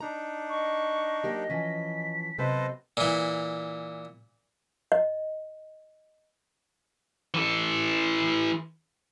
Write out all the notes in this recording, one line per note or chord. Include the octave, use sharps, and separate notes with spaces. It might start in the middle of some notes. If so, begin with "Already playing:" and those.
D4 D#4 A#5
D#5 C#6
F#3 A#3 G4
E3 F3 C#4 B6
C3 F#3 B3 A4 B4 C5 D#5
A#2 E3
D#5
E3 A4